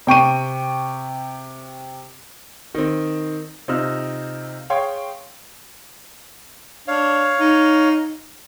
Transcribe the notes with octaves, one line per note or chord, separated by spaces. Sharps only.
C3 G5 C#6 D#7
D#3 C4
C3 C4 D#4 F4 E6 F6
G#4 C#5 F5 G5 C6 C#6
D4 C#5 F5
D#4